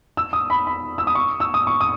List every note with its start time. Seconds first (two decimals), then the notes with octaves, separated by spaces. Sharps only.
0.17 E6
0.33 D#6
0.50 B5
0.67 B5
0.98 E6
1.07 D#6
1.15 C#6
1.40 E6
1.54 D#6
1.67 C#6
1.81 D#6